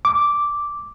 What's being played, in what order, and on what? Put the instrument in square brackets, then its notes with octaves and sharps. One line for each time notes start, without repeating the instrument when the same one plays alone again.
[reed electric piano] D6